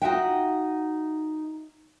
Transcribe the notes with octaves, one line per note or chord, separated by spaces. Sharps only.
D#4 F4 F#4 E5 F#5 G5